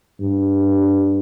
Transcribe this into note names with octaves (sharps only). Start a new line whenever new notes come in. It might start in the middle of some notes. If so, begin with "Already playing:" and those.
G2